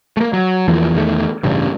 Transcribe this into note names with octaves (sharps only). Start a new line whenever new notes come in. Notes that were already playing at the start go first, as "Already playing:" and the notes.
A3 A#3
F#3
E2 E3 F3 A#3
E2 D#3 A3
A1 G2 C#3